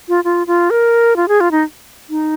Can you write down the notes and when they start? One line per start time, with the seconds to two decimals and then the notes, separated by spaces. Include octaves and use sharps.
0.09 F4
0.24 F4
0.47 F4
0.70 A#4
1.16 F4
1.28 G#4
1.40 F4
1.51 D#4
2.10 D#4